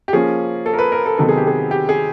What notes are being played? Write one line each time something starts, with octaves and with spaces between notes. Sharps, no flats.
G4
F3 A#3 C#4 G#4
A4
A#4
B4
A#4
A4
C3 D#3 F#3 B3 A4
G#4
G4
G#4
G4
G#4